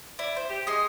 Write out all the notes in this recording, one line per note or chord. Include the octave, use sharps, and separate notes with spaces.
E4 D5
C5
G4
G#3 D#5 C6